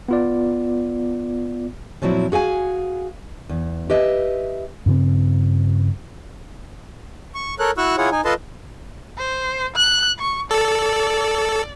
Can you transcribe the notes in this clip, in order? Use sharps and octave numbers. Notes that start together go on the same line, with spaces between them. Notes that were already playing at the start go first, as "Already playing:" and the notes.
B3 F4 D5
A#2 F3 F#3 C4 E4
F#4 G#4 F5 G#5
E2
G4 B4 D#5 E5
G2 C#3 C4
C#6
A4 A#4 C#5 F#6
E4 F#4 C#6 E6 F#6
E4 F4 G#4 C#5 F#5
D#4 G#5
F4 A4 B4 D#5 A5 C6
C5
F#6
C#6
A4 D5